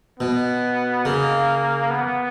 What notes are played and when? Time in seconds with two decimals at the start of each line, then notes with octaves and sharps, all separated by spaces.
0.20 B2 B3
1.05 C#3 A#3
1.90 B3